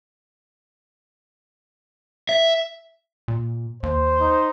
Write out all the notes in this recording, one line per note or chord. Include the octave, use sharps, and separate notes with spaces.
E5
A#2
D#2 C5
D#4